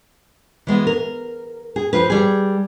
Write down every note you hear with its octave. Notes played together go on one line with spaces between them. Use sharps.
E3 G#3 B3
A#4
G#4
F3 F4 B4
G3 G#4